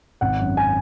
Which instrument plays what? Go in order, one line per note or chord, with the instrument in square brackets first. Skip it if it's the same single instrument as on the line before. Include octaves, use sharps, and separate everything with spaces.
[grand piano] G#1 F#5
F#2
G#5